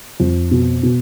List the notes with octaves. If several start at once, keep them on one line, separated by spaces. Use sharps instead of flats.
F2
B2
B2